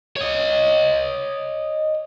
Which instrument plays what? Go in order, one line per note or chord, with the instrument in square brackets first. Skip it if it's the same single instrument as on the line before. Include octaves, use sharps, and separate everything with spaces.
[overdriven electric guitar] C#5 D#5